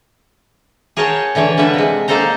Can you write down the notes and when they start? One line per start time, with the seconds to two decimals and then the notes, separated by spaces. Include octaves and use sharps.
0.97 G#4 A#4 C#5 F#5 G5 A5
1.35 D3 E3 D4 C#5
1.57 D3 G3 F4 B4 E5 F#5
1.74 C3 G#3
2.08 A#3 D#4 A4 C5 A#5